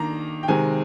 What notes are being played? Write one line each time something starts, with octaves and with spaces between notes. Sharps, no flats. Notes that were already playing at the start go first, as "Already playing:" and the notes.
Already playing: D#3 A#3 D4 A#5
G5
C3 D#3 G#3 C4 G#5